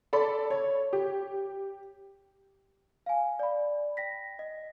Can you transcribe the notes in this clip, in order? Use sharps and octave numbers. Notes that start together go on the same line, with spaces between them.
A4 D5 B5
C#5
G4
F5 G#5
D5 B5
G5 A#6 B6
D#5